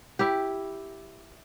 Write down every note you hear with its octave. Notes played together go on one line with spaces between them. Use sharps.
E4 G4